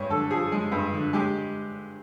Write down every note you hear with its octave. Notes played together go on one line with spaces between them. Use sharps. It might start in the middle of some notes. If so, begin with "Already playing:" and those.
Already playing: G2 G#3 C#5
D3 A4
F3 G#4
G#3
G2
D3
G#3 G4